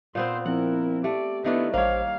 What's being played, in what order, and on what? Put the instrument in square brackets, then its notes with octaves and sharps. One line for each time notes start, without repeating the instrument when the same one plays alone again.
[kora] A#2 B3 C4 [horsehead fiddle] C5
[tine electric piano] F3 C4 [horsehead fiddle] E4 A#4 [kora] F#5
[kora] A3 [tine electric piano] G4 [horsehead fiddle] D5
[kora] D#3 A3 D4 [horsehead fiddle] B3 E4
[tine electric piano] A1 C5 [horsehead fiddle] G3 F5 [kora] A#3 C#5